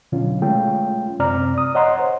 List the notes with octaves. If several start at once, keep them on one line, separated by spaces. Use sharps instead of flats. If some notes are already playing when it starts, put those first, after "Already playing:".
B2 D3 F#3 C#4 F4
G#3 A3 C#4 F4 G5
F#2 C3 C4 D5 A#5 F6
D#6
C#5 D#5 F#5 A#5 C6
C5